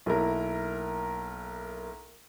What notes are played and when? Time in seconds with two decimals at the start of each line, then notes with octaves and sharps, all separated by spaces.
0.06 B1 A#3 E4 A#4